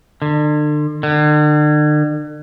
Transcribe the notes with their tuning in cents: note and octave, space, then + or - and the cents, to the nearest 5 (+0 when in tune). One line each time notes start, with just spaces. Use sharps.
D3 +35
D3 +40